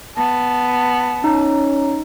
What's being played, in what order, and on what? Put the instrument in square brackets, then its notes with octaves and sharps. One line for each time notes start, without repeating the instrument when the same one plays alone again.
[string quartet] B3 [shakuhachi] A5
[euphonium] C#4 [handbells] D#4 A#5